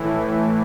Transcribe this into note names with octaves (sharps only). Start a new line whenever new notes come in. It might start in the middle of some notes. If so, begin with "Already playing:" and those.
Already playing: A2 E3